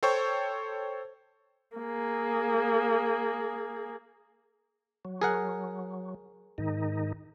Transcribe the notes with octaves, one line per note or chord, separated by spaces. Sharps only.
A4 C5 C#5 G5 C#6
A#3 G#4
F#3
G#4 A#4 F#5
G#2 D#3 D#4